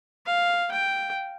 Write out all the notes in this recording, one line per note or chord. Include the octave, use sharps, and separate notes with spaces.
F5
G5